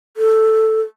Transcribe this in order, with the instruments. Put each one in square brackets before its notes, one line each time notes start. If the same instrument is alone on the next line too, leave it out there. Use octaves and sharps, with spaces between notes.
[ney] A4